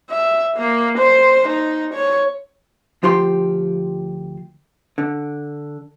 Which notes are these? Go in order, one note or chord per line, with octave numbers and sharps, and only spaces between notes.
E5
A#3
C5
D#4
C#5
D2 F3 F4 G4 C6
D3